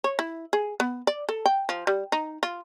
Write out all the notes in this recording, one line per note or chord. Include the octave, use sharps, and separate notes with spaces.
C#5
E4
G#4
B3
D5
A4
G5
F3
G3
D#4
F4